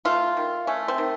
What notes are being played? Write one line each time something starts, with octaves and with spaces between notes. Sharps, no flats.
A3 F4
D#3
A3 C#4
C4
D#3